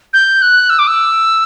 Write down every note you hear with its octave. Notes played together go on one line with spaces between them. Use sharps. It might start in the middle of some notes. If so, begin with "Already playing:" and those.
G6
F#6
E6
D6
E6